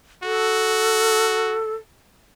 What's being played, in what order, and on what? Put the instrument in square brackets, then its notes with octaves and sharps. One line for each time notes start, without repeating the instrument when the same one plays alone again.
[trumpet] F#4 [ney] A4